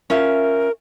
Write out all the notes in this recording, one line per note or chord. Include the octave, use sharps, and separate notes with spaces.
C#4 F4 A#4 E5